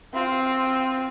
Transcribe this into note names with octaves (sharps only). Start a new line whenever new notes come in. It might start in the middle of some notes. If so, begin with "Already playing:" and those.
C4 F4